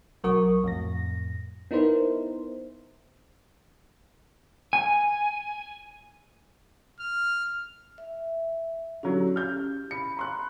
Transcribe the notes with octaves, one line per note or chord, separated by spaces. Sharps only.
B1 F#3 F#4 A#4 C#6 D#6
F2 A2 A#6
B3 D#4 E4 A#4 C5
G#5
F6
E5
D3 F#3 C#4 E4 G4
F6 G6
B5 C#7
A#5 C6 F#6